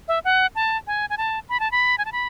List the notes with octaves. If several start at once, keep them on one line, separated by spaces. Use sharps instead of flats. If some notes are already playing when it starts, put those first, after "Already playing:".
E5
F#5
A5
G#5
G#5
A5
B5
A5
B5
G#5
A5
B5